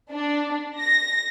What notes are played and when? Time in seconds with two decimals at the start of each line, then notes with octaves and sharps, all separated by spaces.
0.11 D4
0.80 A#6